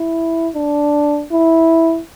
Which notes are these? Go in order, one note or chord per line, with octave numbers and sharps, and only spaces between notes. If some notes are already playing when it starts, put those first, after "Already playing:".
Already playing: E4
D4
E4